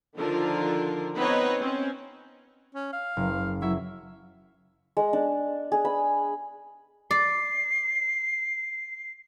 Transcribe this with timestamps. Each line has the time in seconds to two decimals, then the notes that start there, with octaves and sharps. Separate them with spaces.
0.18 D3 D#3 F3 F4 A#4
1.16 B3 C4 D#4 B4 C#5 D#5
1.59 C4 C#4
2.75 C#4
2.93 F5
3.17 F#1
3.62 F#3 E4 E5
4.97 G#3
5.13 D4
5.72 G#4
5.85 B5
7.11 D5 C7